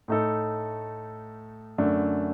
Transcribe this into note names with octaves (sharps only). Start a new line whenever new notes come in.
A2 A3 D#4 A4
F#2 D3 A3 D4